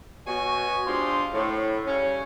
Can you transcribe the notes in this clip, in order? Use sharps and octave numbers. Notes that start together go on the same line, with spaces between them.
B2 F#4 C#5 G#5
G#3 D4 F4 G4 C5
A2
C#3 G3 C#4